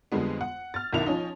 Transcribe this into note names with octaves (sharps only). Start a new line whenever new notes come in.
F2 D3 G3 G#3 B3
F#5
F6 A6
B1 F#2 D#3 E4 F7
F3 C#4 D#4